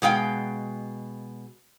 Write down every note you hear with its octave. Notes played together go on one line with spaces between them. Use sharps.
B2 G#3 F5 G5